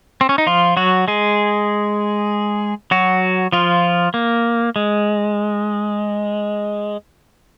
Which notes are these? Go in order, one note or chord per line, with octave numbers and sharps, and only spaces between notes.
C4
C#4
D#4
F3 F4
F#3 F#4
G#3 G#4
F#3 F#4
F3 F4
A#3
G#3